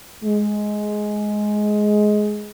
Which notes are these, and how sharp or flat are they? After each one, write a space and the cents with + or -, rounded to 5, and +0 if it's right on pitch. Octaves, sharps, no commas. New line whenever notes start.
G#3 +10